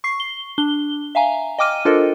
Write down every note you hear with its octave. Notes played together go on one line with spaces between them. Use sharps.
C#6 C7
G7
D4 G7
E5 F5 G#5 A#5
D#5 G5 D6 F6 D#7
D4 F4 A4 A#4 C5 D#5